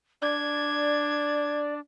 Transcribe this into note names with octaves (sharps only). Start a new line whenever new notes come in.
D4 D5 G#6